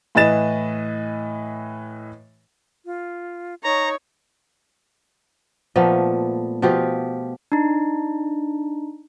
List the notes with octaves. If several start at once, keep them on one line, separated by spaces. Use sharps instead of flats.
A2 E3 B4 D#5 A6 E7
F4
D#4 C#5 A#5
A#2 F3 A3 B3
B2 F3 F4 G4
D4 D#4